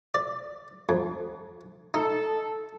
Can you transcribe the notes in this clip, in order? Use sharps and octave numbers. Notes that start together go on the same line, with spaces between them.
D5
F2
D#4 A4